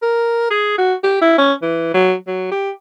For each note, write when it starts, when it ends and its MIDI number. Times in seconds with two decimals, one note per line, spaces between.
0.02 0.49 70
0.50 0.74 68
0.78 0.94 66
1.03 1.18 67
1.21 1.36 64
1.38 1.53 61
1.62 1.89 52
1.94 2.14 54
2.27 2.49 54
2.51 2.71 67